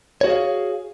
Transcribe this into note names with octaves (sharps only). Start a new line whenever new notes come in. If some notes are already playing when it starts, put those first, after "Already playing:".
F#4 G#4 C#5 F5